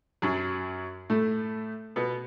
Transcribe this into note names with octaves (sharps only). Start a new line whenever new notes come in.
F#2 F#3
A2 A3
B2 B3